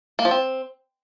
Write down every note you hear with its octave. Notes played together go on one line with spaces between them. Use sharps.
A#3
F3
C4